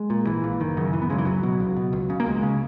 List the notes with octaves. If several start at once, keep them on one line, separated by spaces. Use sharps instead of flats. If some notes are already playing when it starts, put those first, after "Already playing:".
Already playing: G#3
A#2
A#1 E3
A#2
F#1 D#3
F#2 C#3
F#1 E3
B3
F#2 C#3 G#3
E3
C#2 F#3
B2
C#2
B2
C#2
C#3
A#3
C#2 G#3
C#3